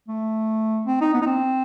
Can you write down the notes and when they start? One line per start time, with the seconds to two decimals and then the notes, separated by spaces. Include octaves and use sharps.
0.08 A3
0.87 C4
1.01 D#4
1.14 B3
1.22 D#4
1.26 C4